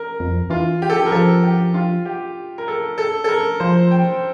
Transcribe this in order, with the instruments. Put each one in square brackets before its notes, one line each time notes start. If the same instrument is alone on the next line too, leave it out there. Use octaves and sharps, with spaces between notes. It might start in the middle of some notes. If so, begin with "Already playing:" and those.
Already playing: [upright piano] A#4
[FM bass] F2
[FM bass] E3 [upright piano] F4
[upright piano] G4
A4
G4
A#4
[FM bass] F3 [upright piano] A4
[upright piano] G4
F4
G4
A#4
A4
A4
A4
A#4
[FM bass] F3 [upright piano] C5
[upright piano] G5